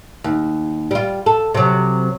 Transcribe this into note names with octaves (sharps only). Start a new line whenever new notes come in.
D#2
G3 F4
A4
C3 F#3